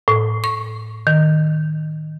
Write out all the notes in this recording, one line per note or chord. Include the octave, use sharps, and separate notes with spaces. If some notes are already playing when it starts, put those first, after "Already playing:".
A2
C#6
D#3